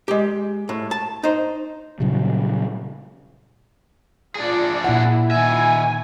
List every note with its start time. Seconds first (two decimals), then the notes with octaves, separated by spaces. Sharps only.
0.08 G#3 G4
0.69 A2
0.91 A5
1.23 D#4 C5
2.00 A#2 C#3 F#3 G3
4.35 D4 F4 G#4 D5
4.84 A#2 E4 F#5
5.31 D#3 E5 G#5